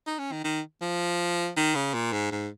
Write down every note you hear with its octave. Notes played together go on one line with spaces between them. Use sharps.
D#4
C#4
D#3
D#3
F3
D#3
C#3
A#2
G#2
G#2